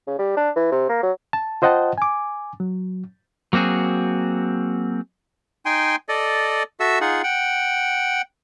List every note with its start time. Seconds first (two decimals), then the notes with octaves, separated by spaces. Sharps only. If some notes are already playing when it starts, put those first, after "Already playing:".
0.07 C#3
0.19 G3
0.37 D4
0.56 E3
0.72 C3
0.89 A#3
1.03 F#3
1.33 A5
1.62 F4 C5 D#5 F#5 G5 A5
1.98 G#5 D6
2.60 F#3
3.53 F#3 A#3 C4 F#4 G#4
5.66 D#4 G5 G#5 C6
6.09 A4 D5 D#5
6.80 F#4 A4 E5 E6
7.01 D#4 F4 G#4 F#5
7.24 F#5 G5